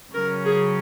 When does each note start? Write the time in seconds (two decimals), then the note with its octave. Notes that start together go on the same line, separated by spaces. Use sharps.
0.14 C#3 F#3 C#4 A#4
0.45 G#4